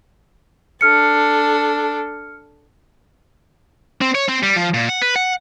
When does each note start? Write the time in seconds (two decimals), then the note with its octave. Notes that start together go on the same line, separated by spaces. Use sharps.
0.81 D4 A4 F6 C#7
4.01 C4
4.15 C#5
4.29 C4
4.43 G3
4.56 F3
4.74 A#2
4.89 F#5
5.02 B4
5.16 F#5